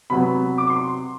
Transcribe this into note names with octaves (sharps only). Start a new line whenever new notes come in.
C3 F#3 B3 B5
D6
C6